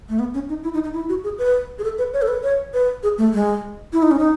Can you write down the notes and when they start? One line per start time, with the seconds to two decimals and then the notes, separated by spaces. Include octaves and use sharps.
0.09 A3
0.19 B3
0.34 C#4
0.49 D#4
0.64 E4
0.74 D#4
0.84 D#4
0.93 E4
1.09 F#4
1.24 G#4
1.39 B4
1.79 G#4
1.84 A4
1.98 B4
2.14 C#5
2.22 A4
2.28 B4
2.43 C#5
2.74 B4
3.03 G#4
3.18 A3
3.34 G#3
3.93 E4
4.02 D#4
4.11 C#4
4.19 D#4